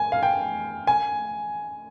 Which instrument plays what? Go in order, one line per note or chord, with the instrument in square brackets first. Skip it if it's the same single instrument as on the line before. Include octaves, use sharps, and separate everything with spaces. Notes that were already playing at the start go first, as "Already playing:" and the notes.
Already playing: [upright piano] G#5
F5
G5
G#5